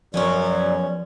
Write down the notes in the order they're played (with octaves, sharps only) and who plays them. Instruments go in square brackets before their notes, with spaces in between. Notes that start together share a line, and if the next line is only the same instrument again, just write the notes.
[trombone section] F#2 [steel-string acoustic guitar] B2 G#3 C#4 [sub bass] F3 [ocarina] D5